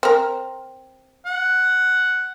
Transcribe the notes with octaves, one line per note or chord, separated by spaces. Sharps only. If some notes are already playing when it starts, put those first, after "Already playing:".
C4 A#4
F#5